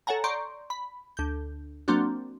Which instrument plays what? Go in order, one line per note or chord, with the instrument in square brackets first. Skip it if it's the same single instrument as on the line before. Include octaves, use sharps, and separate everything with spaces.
[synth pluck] A4 C#5 F#5 G#5 A#5
D5 A#5 C6 C#6 G6 D7
B5
D2 G6
F#3 A#3 C4 D4 F#4